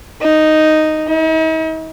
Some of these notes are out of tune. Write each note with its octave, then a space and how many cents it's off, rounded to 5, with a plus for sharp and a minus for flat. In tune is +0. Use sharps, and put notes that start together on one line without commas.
D#4 +0
D#4 +45